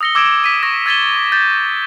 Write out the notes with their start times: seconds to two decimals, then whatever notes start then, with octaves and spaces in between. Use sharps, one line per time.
0.01 D#6 E6 A#6 C#7 G7
0.15 D6 E6 G#6 A#6 D7 E7
0.44 B6 D#7
0.63 C#6 D#6 A#6
0.86 E6 G#6 A6 B6 E7 G7
1.32 G6 A6